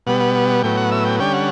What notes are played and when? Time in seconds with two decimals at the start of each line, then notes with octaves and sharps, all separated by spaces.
0.06 B2 G3 B3 F#5
0.21 F#5
0.35 F#5
0.49 F#5
0.63 A2 F#3 B3 G5
0.77 F#5
0.91 E5
1.05 G5
1.19 D3 G3 C#4 G5
1.33 F#5